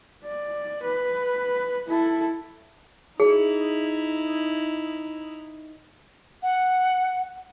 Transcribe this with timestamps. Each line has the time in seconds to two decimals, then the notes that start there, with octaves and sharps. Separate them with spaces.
0.25 D5
0.83 B4
1.88 E4 A4
3.20 D#4 E4 G#4
6.43 F#5